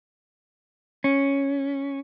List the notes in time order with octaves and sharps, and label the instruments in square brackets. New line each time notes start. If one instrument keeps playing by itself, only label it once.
[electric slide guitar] C#4